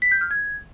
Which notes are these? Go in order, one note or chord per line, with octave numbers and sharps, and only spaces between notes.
B6
G6
F6
G#6